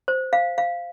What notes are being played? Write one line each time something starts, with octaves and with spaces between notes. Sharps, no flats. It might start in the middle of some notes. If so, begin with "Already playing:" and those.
C5
F5
F5